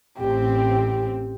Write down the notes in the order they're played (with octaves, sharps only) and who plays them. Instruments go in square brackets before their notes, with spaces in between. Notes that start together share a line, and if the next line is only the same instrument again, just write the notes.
[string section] A1 C4 [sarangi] G4